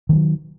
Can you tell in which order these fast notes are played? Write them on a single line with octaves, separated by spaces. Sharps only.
D#3 G#3 F#3